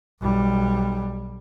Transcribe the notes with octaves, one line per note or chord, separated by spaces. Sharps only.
B1 G3